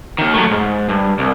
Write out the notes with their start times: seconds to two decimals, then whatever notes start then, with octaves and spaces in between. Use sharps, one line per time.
0.18 D#2 D#3
0.34 F#3 A3
0.51 G#2
0.89 G2
1.19 C2